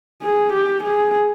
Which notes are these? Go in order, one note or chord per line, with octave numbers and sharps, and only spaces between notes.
G#4
G4
G#4